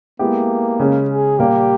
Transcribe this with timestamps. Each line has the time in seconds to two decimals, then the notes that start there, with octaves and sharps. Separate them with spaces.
0.19 G#3 A#3 B3 E4 G4
0.80 C#3 G#3 C#4
1.09 G#4
1.39 A#2 G3 A#3 G4